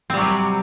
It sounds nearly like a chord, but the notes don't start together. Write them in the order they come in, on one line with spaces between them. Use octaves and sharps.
C4 G3 F#3 C3